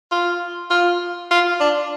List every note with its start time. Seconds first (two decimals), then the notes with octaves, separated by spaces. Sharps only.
0.12 F4
0.70 F4
1.31 F4
1.60 D4